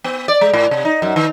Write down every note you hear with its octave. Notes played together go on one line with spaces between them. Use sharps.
B3
D5
G#3
A2
C3
D#4
F#2
D#3